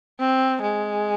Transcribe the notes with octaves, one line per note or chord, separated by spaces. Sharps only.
C4
G#3